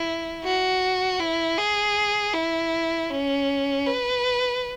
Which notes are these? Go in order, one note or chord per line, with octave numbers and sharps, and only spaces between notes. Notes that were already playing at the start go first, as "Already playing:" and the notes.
Already playing: E4
F#4
E4
G#4
E4
C#4
B4